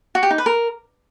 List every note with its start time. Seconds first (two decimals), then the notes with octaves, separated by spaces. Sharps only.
0.15 F#4
0.23 G4
0.30 D#4
0.38 B4
0.46 A#4